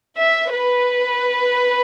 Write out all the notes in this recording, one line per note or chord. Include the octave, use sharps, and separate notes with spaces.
E5
B4